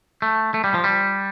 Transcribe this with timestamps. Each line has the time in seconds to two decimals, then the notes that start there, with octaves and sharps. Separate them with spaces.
0.22 A3
0.54 A3
0.64 G3
0.74 F3
0.84 G3